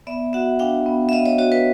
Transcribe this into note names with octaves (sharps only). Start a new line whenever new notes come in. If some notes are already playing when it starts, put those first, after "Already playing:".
B3 D5 E5
F#4 E5 F#5
D4 F5 G5
B3
E5
B3 D#5 F5
C#5 D#5
F#4 C#5 D#5
B4 C#5